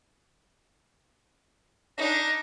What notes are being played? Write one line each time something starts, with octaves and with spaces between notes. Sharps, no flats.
D4 D#4 A#6